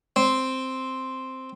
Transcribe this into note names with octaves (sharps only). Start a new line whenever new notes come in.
C4